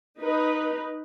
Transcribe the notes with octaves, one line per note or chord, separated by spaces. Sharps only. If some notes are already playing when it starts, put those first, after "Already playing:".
D#4 B4